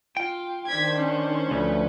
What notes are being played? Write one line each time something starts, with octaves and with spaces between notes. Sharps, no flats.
F4 G5
D#3 D4 C5 G#6 B6
C#4
D2 F3 A3 B4